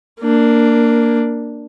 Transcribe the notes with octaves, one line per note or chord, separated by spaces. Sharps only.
A#3 D4